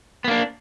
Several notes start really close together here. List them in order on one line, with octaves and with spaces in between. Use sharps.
B3 A#3 D4